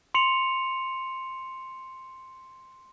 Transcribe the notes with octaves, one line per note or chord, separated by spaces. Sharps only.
C6 C#7 F7